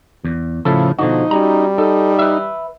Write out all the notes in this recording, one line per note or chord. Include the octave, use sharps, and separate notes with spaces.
E2
A2 C#3 F3 E4 A4
B2 D3 F3 D#4 F#4
G3 C#4 F#4 A#5
D#4 A4
B4 E5